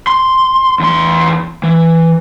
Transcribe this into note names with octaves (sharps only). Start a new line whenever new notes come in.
C6
E2 C6
E3